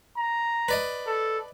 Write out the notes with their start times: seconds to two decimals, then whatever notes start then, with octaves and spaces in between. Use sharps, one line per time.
0.17 A#5
0.68 B4 D5 D#5
1.07 A4